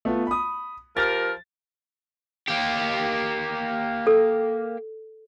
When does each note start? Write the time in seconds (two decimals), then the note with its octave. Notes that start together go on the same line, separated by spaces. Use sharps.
0.05 A3 B3 F4
0.27 B5 D#6
0.97 F3 G4 A#4 A6
2.48 A#3 G4
4.07 A4